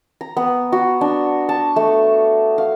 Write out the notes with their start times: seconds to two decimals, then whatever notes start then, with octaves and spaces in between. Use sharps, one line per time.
0.21 A#5
0.37 B3
0.72 F#4
1.01 D4
1.49 A5
1.76 A3
2.58 F5